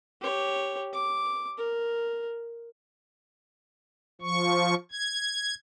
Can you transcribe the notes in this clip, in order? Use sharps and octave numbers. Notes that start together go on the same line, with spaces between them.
G4 C#5
D6
A#4
F3 C#6
G#6